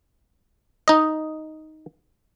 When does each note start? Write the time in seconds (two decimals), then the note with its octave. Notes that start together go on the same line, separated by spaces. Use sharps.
0.88 D#4 D#5